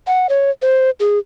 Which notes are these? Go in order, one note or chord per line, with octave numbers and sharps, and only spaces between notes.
F#5
C#5
C5
G#4